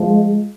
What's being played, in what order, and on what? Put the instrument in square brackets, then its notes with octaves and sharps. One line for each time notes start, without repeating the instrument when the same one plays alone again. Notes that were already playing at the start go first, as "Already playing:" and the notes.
Already playing: [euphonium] F3 [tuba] G#3